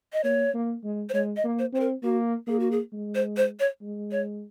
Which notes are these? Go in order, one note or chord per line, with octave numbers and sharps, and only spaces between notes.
D#5
A#3 C#5
A#3
G#3
C5
G#3 C#5
D#5
A#3
C5
C4 C5
A#4
A#3 F#4
A#3 G#4
F#4
G#4
G#3
C5
C5
C#5
G#3
C#5